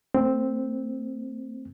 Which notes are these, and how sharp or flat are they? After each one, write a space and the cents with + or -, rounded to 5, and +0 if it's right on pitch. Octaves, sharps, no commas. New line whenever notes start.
A3 +40 C4 +0